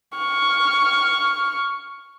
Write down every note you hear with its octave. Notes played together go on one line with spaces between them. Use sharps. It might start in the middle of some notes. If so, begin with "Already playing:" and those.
C#6 F6